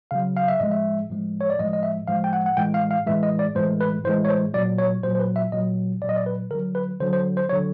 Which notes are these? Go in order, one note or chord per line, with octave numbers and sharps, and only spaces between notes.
C#3 F#3 F5
F5
E5
A2 F3 G#3 D#5
E5
A2 F3 G#3
C#5
D5
A2 F3 G#3 D#5
D#5
E5
A2 F3 G#3 F5
G5
F#5
F#5
A2 E3 G#3 G5
F5
F5
A2 E3 G#3 E5
D#5
D5
A2 E3 G#3 C5
B4
A2 E3 G#3 C5
C#5
C5
A#2 F#3 D5
C#5
A#2 F#3 C5
C5
B4
E5
A#2 F#3 D#5
A#2 F#3 D5
D#5
D5
B4
D3 F#3 A#4
B4
D3 F#3 C5
C5
C5
D3 F#3 C#5